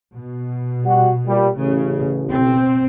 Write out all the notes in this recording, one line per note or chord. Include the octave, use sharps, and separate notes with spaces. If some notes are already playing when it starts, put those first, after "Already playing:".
B2
G3 F#4
A#2 G3
A1 C#3
B2 C4